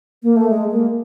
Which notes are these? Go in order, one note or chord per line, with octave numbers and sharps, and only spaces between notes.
A#3
A3
G#3
A#3